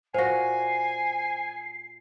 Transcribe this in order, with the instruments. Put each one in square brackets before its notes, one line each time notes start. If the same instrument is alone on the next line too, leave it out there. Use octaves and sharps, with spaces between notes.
[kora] A#2 F#4 [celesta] C5 A#6 [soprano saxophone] G#5 [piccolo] C7